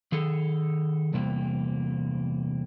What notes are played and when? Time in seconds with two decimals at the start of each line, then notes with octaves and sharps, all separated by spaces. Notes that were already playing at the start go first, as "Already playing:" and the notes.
0.12 D#3 G#4 A4
1.14 E2 C3 G3 A#3